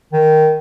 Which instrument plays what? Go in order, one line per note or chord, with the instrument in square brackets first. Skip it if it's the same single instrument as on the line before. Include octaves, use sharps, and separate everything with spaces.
[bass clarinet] D#3